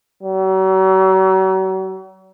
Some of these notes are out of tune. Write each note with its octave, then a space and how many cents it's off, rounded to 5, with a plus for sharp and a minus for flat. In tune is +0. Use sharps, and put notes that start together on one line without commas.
F#3 +40